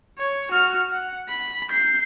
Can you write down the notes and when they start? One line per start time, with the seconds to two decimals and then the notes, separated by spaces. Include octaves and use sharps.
0.18 C#5
0.51 F#4 F6
0.91 F#5
1.29 B5
1.70 G6 C7